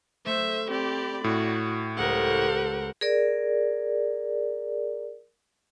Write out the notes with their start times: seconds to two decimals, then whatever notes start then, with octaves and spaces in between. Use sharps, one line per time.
0.26 A3 C5 E5
0.68 C4 G4 D5 B5
1.24 A2 F#4
1.97 C#2 G4 A4 A#4 C5 F#5
3.01 G#4 A#4 D5